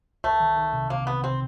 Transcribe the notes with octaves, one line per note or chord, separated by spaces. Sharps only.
C2 A3
D#3
D#3
C3
C3 A#3
C3 B3
C3 C4